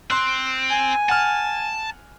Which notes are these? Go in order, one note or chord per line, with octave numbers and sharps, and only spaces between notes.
C4 C6 F#6
G#5
F#5 A5 F6